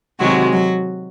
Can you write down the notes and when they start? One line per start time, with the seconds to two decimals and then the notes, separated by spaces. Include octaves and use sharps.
0.20 C3 D#3 F#3 G#3 F#4
0.52 F#3 F#4